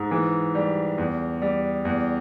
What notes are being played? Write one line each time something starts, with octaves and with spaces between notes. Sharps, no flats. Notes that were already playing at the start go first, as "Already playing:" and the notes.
Already playing: G#2
E3
G3
E2
G3
E2